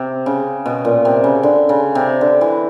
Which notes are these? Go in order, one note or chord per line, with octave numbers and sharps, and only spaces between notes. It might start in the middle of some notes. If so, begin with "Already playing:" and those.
Already playing: C3
C#3
B2
A#2
C3
C#3
D3
C#3
C3
D3
E3